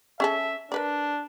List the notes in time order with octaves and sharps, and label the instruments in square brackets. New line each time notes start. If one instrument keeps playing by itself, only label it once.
[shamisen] C#4 G#4 A4 [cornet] E5
[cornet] D4 [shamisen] A#4 B4 D5